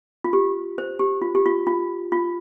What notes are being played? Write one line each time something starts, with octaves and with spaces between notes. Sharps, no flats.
F4
G4
C5
G4
F4
G4
F4
F4
F4